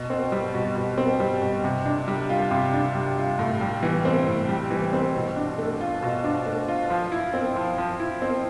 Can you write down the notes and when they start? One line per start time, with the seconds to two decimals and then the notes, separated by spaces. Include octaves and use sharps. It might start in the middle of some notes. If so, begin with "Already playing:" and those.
Already playing: B2
0.10 C4
0.32 G3
0.54 B2
0.76 B2
0.98 C4
1.20 G3
1.42 B2
1.64 C3
1.86 D4
2.08 G3
2.29 F4
2.51 C3
2.73 D4
2.95 G3
3.17 F4
3.39 A2
3.61 G3
3.83 E3
4.05 C4
4.27 A2
4.49 G3
4.71 E3
4.93 C4
5.15 B2
5.36 D4
5.58 A3
5.81 F4
6.03 B2
6.24 D4
6.46 A3
6.68 F4
6.90 F3
7.12 E4
7.34 C4
7.56 F3
7.78 F3
8.00 E4
8.22 C4